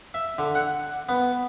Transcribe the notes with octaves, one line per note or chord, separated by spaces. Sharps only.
E5
D3
F#5
B3